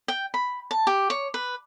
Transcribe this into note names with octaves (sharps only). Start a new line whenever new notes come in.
G5
B5
A5
G4
C#5
B4